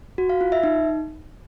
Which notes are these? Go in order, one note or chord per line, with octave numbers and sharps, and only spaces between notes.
F#4
F5
F4
E5
D#4